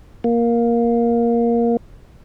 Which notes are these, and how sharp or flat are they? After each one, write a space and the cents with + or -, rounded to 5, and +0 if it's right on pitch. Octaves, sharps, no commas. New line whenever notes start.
A#3 +10